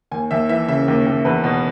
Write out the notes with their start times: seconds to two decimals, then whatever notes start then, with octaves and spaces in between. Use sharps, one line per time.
0.11 D#2 G#5
0.31 D#2 E5
0.49 E3 E5
0.68 C#3 E5
0.88 D#2
1.06 D#2
1.25 E2 B4
1.44 B2